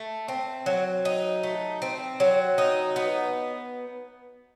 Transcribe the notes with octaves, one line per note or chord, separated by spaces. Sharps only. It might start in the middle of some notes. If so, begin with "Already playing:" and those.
Already playing: A3
C4
F#3
D#4
A3
C4
F#3
D#4
B3